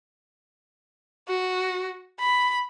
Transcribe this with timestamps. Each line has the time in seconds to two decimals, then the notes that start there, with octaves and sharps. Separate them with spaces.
1.28 F#4
2.20 B5